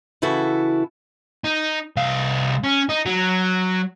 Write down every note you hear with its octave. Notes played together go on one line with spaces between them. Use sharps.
C#3 E3 E4 F#4 A4
D#4
C2 F5
C#4
D#4
F#3